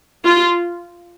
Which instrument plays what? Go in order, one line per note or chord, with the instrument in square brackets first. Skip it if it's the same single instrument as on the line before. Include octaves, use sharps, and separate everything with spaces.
[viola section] F4